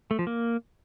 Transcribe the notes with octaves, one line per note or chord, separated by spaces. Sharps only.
A3
F3
A#3